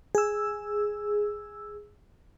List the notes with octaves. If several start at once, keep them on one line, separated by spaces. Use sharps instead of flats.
G#4 E6